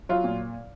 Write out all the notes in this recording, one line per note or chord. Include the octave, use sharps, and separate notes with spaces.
F#3 F4
A#2